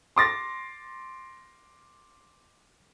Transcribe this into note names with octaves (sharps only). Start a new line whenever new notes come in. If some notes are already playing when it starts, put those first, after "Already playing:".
C6 D6 A6 A#6